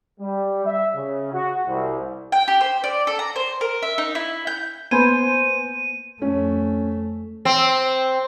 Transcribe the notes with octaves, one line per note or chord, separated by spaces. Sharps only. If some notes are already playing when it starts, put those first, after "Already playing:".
G3
E5
C#3
F#4
C2
G5
G4
C5
D5
A4
A#5
C5
A#4
E5
D#4
E4
G6
A#3 B3 C5 G#5 B5 C6 D#7
F2 A3 C#4
C4